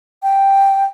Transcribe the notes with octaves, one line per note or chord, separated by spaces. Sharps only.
G5